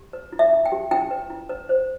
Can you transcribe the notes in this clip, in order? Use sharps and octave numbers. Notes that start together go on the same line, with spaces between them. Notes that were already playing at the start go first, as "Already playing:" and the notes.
Already playing: G4
B4
E4
E5
E4
G5
G4
E4 G5
B4
E4
B4
C5